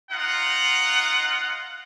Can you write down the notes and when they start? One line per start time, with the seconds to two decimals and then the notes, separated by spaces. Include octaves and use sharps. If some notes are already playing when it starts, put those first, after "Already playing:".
0.11 D#4 F4 F#5